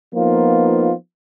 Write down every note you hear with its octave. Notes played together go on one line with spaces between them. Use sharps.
F3 A#3 B3 D#4 F4